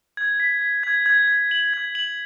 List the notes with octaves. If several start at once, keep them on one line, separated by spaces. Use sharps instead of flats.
G#6
B6
B6
G#6
G#6
G#6
F#7
G#6
F#7